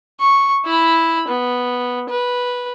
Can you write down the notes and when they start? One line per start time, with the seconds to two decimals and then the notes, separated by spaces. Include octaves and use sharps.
0.20 C#6
0.66 E4 B5
1.28 B3
2.10 B4